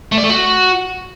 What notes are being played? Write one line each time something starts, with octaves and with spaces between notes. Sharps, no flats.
A3
D5
A3
F#4